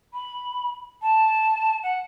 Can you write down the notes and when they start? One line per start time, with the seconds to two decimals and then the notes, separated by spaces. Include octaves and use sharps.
0.14 B5
1.02 A5
1.83 F#5